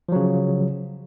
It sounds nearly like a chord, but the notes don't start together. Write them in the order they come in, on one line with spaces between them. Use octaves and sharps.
F3 F#3 C#3